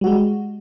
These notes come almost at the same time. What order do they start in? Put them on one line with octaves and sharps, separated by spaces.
G3 F#4 G#3